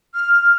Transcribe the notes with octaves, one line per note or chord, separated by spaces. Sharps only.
F6